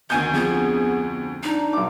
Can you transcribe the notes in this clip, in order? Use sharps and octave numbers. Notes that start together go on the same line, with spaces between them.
D2 D#3 B3 G#5 G6
F2 B3 G#4
D4 D#4
B1 D6